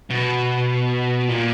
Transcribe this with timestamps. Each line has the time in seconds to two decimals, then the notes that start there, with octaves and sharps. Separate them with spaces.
0.10 B2
1.28 A#2